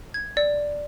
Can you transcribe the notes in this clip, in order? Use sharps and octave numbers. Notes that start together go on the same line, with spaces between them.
G#6
D5